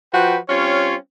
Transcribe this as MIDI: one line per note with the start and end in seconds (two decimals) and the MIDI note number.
0.14 0.37 53
0.14 0.37 65
0.14 0.37 66
0.14 0.37 71
0.14 0.37 79
0.49 0.95 55
0.49 0.95 60
0.49 0.95 61
0.49 0.95 65
0.49 0.95 73